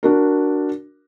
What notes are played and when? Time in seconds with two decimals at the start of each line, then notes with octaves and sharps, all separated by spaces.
0.03 D4 F#4 A#4